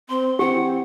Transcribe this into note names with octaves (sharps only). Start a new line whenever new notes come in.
C4 C6
E3 C4 G4 F#5